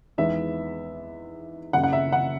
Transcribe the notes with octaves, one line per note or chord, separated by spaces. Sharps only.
E2 D#3 G#3 B3 E5
F#1 F#2 C#3 F#5
F#5
E5
F#5